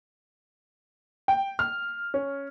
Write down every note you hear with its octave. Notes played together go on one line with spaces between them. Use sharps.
G5
F6
C#4